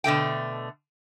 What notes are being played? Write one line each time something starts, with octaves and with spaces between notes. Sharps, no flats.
B2 D3 A3 G5